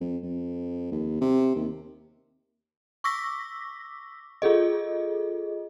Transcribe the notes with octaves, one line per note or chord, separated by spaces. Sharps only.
F2
F2
D#2
C3
D#2
C#6 D6 E6 A#6 B6
F4 G#4 A4 D#5